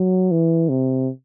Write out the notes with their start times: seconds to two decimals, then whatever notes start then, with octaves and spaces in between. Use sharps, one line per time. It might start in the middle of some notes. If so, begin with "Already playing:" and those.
Already playing: F#3
0.31 E3
0.69 C3